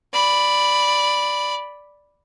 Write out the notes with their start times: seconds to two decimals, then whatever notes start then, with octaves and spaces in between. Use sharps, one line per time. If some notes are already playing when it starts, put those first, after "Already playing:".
0.13 D5 B5